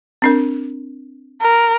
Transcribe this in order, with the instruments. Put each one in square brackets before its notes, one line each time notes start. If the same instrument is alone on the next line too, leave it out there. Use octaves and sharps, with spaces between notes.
[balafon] C4 D4 A#4
[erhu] A#4